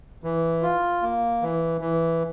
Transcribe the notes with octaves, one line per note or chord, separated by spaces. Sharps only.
E3
F4
A#3
E3
E3